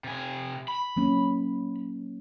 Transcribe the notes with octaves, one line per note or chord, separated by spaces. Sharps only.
C3 G#5
B5
F#3 A#3 C#4